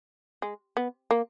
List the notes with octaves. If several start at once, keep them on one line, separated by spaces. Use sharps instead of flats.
G#3
B3
A#3